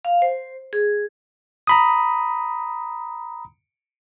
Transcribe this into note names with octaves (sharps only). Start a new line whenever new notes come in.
F5
C5
G#4
A#5 B5 D#6